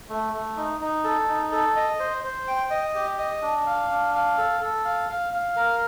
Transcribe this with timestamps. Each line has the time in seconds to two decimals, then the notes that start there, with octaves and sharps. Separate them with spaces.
0.10 A3
0.33 A3
0.57 D#4
0.80 D#4
1.04 A4
1.28 D#4
1.52 A4
1.76 D#5
2.00 C5
2.24 C5
2.48 G5
2.70 D#5
2.95 G4
3.19 D#5
3.42 D4
3.67 F5
3.90 D4
4.14 F5
4.38 A4
4.61 A4
4.85 F5
5.09 F5
5.32 F5
5.56 A#4